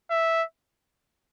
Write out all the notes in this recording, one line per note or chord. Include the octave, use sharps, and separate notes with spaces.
E5